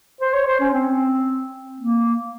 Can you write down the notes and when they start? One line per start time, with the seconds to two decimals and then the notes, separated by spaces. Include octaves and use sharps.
0.21 C5
0.33 C#5
0.47 C5
0.60 C#4
0.74 C4
1.80 A#3